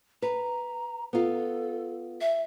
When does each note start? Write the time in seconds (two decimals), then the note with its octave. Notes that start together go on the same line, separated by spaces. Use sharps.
0.22 B4 A#5
1.13 B3 F4 A4
2.21 E5